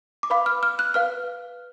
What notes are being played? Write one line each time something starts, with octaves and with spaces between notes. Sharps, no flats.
D6
B4 F5 B5
F6
F6
F#6
B4 F5 F6